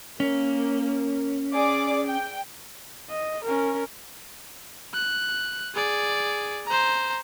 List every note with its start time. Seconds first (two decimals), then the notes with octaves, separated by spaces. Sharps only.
0.20 A#3 C#4
1.53 G#4 D5 D6
2.07 G5
3.10 D#5
3.45 C#4 A#4
4.94 F#6
5.75 G#4 D5
6.66 C5 A#5